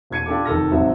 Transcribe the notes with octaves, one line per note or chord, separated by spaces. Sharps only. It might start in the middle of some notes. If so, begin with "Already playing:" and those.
E1 B2 G#6 C#7 D#7
D4 F4 G4 A4 A5 D6
F1 D#3 A4 F6 A#6
F1 G#2 C3 F#3 E5